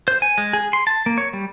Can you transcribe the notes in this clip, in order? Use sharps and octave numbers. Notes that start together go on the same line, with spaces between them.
C5
G#5
G#3
G#4
C6
A5
A#3
C#5
G3